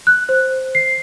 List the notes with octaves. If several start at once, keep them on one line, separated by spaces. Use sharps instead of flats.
F#6
C5
C7